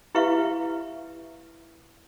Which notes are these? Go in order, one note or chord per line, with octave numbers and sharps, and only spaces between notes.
E4 G4 B4 E5 F5 C#6